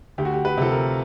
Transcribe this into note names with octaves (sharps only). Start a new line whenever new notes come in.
D2 G4
F#4
G4
B4
C3 F3 A4
A#4